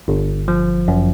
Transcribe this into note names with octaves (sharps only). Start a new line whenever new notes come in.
G1
F3
F#2